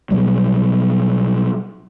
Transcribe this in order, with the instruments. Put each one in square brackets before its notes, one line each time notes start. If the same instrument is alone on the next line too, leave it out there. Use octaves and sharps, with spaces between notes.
[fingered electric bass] B2 F#3 G3